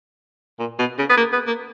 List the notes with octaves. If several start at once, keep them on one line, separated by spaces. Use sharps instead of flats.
A#2
B2
C#3
B3
A#3
B3
A#3